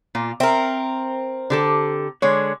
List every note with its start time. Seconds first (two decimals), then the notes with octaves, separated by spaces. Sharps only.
0.15 A#2 F4
0.40 C4 A#4 E5
1.50 D3 G4 A4
2.22 D3 G#3 C#5